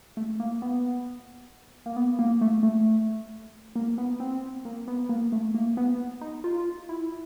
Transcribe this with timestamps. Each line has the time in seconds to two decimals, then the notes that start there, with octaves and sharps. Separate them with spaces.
0.17 A3
0.40 A#3
0.62 B3
1.86 A#3
1.96 B3
2.19 A#3
2.41 A3
2.63 A3
3.75 A#3
3.98 B3
4.20 C4
4.65 A#3
4.88 B3
5.09 A#3
5.32 A3
5.54 A#3
5.77 B3
6.21 D#4
6.44 F4
6.89 E4